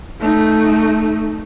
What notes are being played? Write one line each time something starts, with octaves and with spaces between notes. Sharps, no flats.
A3 D#4